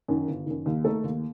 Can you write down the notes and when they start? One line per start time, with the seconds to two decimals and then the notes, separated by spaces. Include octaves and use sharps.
0.08 F#2 D#3
0.27 G1
0.46 F#2 D#3
0.66 D#2
0.84 D#3 A3 D#4 A4
1.04 D#2